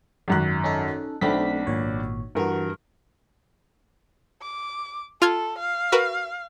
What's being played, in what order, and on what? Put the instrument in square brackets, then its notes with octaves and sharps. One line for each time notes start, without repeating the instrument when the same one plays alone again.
[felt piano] G#1 F#2 F#6
[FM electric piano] C#4 D#4 A4
[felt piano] B1 D4 B5 [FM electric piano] A3 C4 B6
[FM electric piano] G#1 A#2 C#5
[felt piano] G2 A#4 [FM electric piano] E3 F#4
[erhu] D6
[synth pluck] F4 F6 G#6 [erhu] A4
[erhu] F5
[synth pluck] F#4 A#4 B4